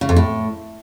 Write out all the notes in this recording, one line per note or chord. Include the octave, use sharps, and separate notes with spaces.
C#3
F2
A2